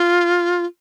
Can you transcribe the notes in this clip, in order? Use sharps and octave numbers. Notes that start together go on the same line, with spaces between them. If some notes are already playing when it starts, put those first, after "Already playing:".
Already playing: F4